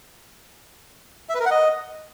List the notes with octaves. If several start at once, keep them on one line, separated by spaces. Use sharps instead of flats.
E5
B4
A#4
F#5
D#5